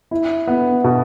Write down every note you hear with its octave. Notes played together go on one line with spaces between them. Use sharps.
E4
B3
B2